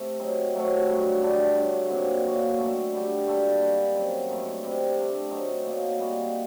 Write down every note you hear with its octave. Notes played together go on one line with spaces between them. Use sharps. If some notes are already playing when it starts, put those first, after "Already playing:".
Already playing: C3 A3
F#3 C4 D#4
C3 F#3 A3
G2 F#3 A3
G3 D4 A4
G2 D3 F#3
A#2 F#3 C4
D#3 F#3 A#3 F#4
D3 A3 D#4 F#4
D3 G3 D4 G4
G3 A#3 F#4 A4
D#3 G3 A#3
F#2 F#3 C4
G2 F#3 A3 D#4
C3 G3 C4 G4
D3 A3 D4
F#3 A3 C4 D#4
A#2 F#3 A#3 D#4
G3 A#3 D#4 F#4